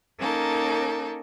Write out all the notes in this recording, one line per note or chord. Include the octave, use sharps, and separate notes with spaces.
A#3 C#4 D#4 A4 A#4